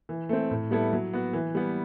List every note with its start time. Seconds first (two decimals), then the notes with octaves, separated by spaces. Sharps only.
0.09 E3
0.29 A3 C4
0.51 A2
0.71 G3 B3 E4 A4
0.93 F#3
1.13 B3 F#4
1.33 E3
1.55 G3 B3